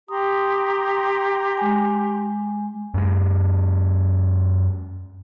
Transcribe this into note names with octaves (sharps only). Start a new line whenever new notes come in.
G4 A#5 C6 D#6
G#3 G#5
F#2 G#3